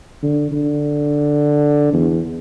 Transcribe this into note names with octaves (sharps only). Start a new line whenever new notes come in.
D3
D3
E2